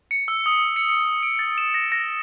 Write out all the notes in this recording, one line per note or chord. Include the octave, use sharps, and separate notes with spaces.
C#7
E6
D#6
C#7
C#7
D7
A6
E7
A#6
A#6